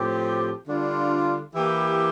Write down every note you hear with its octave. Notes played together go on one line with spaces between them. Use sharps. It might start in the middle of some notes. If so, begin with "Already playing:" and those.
Already playing: A2 F3 C4 G4
D3 G3 D4 F4
E3 A#3 E4 G4